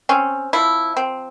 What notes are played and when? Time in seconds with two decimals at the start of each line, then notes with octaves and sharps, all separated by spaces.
0.09 C4 C#4
0.53 F3 E4
0.97 C4